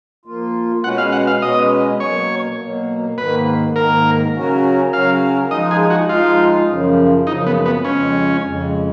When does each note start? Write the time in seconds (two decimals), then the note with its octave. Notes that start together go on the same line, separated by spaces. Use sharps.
0.25 F3 A#3 F4
0.84 B2 G#3 C#4 F#4 B4 F#5
0.98 F5
1.13 F#5
1.27 F5
1.42 B2 G#3 C#4 F#4 B4 D#5
2.00 B2 F#3 A#3 C#5
2.59 B2 F#3 A#3
3.17 G#2 D#3 A#3 B4
3.76 G#2 D#3 A#3 A#4
4.34 C#3 F#3 C#4 F#4 A#4
4.92 C#3 F#3 C#4 F#4 A#4 F5
5.51 F3 G#3 D#4 D#5
5.71 G#4
5.90 F#4
6.09 F3 G#3 D#4 F4
6.68 F#2 C#3 F3
7.27 F#2 C#3 F3 D#4
7.46 B3
7.66 B3
7.85 F2 C#3 G#3 C#4
8.43 F2 C#3 G#3